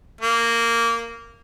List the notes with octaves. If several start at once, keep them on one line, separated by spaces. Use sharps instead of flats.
A#3